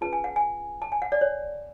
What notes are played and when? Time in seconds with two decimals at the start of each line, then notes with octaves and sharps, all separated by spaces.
0.01 C#4 F4 G#4 B4 A5
0.13 G#5
0.24 F#5
0.36 G#5
0.82 A5
0.92 G#5
1.02 F#5
1.12 D5
1.21 C#5